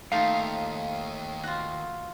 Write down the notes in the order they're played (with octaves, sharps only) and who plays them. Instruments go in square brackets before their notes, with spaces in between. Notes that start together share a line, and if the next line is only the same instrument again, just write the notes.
[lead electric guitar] D#2 [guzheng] A3 D#4 F4 [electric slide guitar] F5
[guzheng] F4 F#4